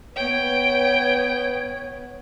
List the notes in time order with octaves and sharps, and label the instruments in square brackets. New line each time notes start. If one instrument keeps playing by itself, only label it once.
[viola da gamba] B3 B4 [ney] C#5 [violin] G5